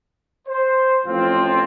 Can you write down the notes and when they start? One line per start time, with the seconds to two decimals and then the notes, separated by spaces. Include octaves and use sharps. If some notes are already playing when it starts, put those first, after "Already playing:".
0.48 C5
1.05 A1 F3 C4 F4